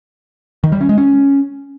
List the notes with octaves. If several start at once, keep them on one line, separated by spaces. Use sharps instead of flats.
D#3
G3
C#4
G#3
C#4